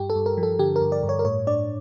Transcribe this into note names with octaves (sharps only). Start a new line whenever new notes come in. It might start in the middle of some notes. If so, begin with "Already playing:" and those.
Already playing: G2 G4
A4
G2
A#4
F3
A4
D3 G4
A#4
G2
D5
G2
C#5
A#4
A2 C#5
D4 D5